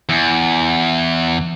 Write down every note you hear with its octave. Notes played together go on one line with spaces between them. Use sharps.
E2